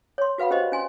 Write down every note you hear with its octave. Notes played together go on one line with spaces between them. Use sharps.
C#5 C6
F#4 B4 F5 F#5 B5
C#4 G4 B4 C5 D#5
C#4 G#5 C6